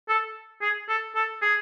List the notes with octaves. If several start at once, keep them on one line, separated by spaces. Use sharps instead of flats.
A4
G#4
A4
A4
G#4